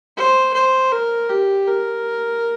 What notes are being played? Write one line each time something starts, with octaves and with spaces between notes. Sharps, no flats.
C5
C5
A#4
G4
A#4